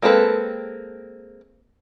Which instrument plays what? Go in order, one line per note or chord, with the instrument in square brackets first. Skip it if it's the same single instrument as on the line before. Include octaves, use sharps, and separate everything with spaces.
[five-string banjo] G#3 A#3 C4 A4 B4